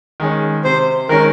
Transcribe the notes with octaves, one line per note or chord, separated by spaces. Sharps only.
D#3 G#3 C#4
C3 C5
D#3 G#3 C#4 A#4